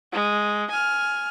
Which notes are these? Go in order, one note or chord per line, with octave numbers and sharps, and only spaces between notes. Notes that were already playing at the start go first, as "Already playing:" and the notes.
G#3
G#5 F6